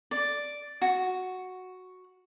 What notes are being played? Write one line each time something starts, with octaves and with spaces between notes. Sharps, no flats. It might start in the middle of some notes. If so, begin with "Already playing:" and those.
D5
F#4